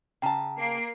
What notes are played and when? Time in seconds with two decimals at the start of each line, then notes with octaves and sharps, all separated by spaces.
0.22 C#3 G5 A5 A#5
0.59 A#3 C7 D7